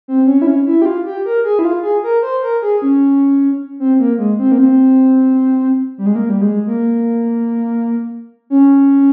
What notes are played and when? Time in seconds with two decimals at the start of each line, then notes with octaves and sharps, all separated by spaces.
0.08 C4
0.27 C#4
0.42 E4
0.47 C#4
0.66 E4
0.82 G4
0.85 F4
1.06 G4
1.26 A#4
1.44 G#4
1.59 E4
1.65 F4
1.83 G#4
2.04 A#4
2.23 C5
2.43 A#4
2.62 G#4
2.82 C#4
3.80 C4
3.99 A#3
4.18 G#3
4.39 C4
4.52 A#3
4.58 C4
5.98 G3
6.06 G#3
6.15 A#3
6.29 G3
6.41 G#3
6.67 A#3
8.50 C#4